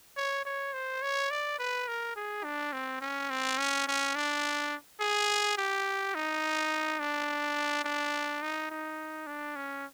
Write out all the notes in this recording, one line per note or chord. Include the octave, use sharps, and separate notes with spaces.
C#5
C#5
C5
C#5
D5
B4
A#4
G#4
D4
C4
C#4
C4
C#4
C#4
D4
G#4
G4
D#4
D4
D4
D#4
D#4
D4
C#4